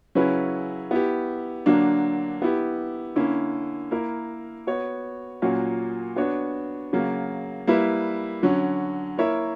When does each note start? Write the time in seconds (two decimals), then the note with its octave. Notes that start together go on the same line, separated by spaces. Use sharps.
0.15 C#3 F#3 C#4 E4 B4
0.91 B3 E4 G4
1.66 D3 F#3 A#3 D4
2.42 B3 E4 G4
3.16 D3 A#3 C#4 E4
3.91 A#3 E4 A#4
4.67 B3 F#4 C#5
5.42 A#2 F#3 A#3 C#4 F#4
6.16 B3 D4 F#4 C#5
6.93 C#3 F#3 A#3
7.67 G3 A#3 E4 B4 E5
8.43 D3 F#3 C#4
9.18 A#3 E4 A#4 C#5 E5